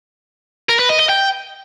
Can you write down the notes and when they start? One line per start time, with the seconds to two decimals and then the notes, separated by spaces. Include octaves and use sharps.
0.69 A#4
0.79 B4
0.89 D#5
0.99 D#5
1.09 G5